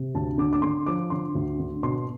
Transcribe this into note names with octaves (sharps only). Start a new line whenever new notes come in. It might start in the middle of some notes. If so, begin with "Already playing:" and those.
Already playing: C3
D2 A5
D3 D6
D6
D3 C6
F3 D6
D3 C6
D2
D3
B2 C6